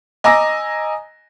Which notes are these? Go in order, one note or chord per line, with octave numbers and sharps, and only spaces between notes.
D#5 G#5 A#5 D6 E6 A#6